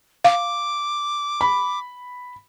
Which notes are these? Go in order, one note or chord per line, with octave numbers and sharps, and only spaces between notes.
F5 D6
B5